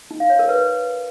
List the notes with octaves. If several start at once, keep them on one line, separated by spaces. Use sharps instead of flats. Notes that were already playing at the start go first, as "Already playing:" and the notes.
D#4
F5
C#5
A#4
B4